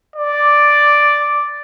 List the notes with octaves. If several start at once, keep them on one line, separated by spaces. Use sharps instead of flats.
D5